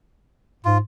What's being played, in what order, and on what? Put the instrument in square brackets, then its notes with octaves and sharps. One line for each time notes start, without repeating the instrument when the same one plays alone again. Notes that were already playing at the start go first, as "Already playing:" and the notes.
[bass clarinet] G#2 [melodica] F4